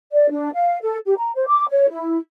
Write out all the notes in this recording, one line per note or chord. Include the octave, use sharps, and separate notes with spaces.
D5
D4
F5
A4
G4
A#5
C5
D6
C#5
E4